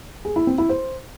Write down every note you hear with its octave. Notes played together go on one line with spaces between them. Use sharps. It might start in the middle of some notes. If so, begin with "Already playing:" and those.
G#4
E4
C4
E4
C5